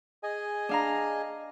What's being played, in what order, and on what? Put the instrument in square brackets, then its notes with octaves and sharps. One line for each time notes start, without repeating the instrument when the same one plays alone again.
[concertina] G#4 D#5 G#5
[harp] D4 F5 A#5